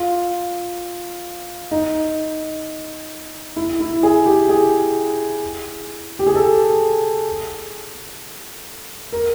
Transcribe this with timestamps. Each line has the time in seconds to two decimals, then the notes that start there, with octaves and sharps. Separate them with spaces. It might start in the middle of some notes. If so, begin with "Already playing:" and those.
Already playing: F4
1.71 D#4
3.56 E4
3.80 E4
4.03 G#4
4.26 G4
4.49 G#4
6.19 G4
6.27 G#4
6.35 A4
9.12 A#4